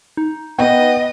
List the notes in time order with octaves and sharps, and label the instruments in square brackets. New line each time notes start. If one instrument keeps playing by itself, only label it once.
[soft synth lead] D#4
[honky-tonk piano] B3 [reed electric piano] B4 F#5 G5 [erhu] D#5